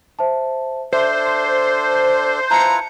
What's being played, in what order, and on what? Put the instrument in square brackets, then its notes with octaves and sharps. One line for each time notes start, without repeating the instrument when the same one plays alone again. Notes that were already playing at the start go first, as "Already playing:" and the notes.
[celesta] C5 E5 A5
[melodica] D4 A4 [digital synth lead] C5 [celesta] E5
[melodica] E4 F4 B4 [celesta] A5 C#7 [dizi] A#5